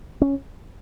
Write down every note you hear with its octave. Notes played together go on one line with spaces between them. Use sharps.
C#4